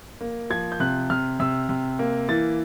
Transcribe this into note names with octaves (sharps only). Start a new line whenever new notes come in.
A#3
F3 G#6
G6
C3 F#6
C3 F6
C3 E6
C3
A#3
E3 A6